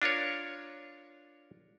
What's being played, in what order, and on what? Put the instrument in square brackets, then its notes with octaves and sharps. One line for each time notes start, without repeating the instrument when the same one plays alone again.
[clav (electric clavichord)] D4 F4 A#4 C#5